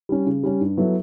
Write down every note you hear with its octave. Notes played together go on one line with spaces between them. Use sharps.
G3 C#4
C#3
G3 C#4
G2
F#3 B3 E4 A4